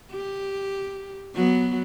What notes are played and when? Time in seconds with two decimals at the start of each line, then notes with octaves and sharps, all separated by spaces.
0.11 G4
1.34 F#3 B3